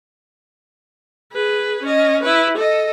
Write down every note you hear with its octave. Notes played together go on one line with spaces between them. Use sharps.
G#4 B4
C#4 D#5
E4 B4
A4 D#5